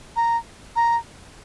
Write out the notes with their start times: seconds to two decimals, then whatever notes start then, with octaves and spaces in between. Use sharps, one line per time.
0.16 A#5
0.76 A#5